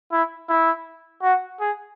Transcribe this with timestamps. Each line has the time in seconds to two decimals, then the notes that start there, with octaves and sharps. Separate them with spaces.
0.12 E4
0.49 E4
1.23 F#4
1.60 G#4